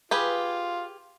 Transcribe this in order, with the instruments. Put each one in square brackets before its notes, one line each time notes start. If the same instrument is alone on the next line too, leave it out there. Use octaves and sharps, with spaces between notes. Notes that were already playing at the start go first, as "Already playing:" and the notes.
[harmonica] F4 [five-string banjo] G4 G#4 B4